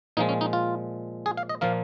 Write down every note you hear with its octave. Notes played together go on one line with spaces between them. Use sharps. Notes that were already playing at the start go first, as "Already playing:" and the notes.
A#2 F3 G#3 D#4
C#4
D#4
F4
G#4
F5
D#5
A#2 F3 A#3 F5